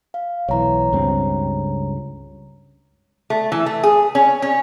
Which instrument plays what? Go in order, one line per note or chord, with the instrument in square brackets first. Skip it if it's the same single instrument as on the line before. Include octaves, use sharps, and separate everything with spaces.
[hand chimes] F5
[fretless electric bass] B1 E3 [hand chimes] C#5 A#5
[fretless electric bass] C#2 G2 C4
[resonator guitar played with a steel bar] A3
E3
A3
G#4
C#4
C#4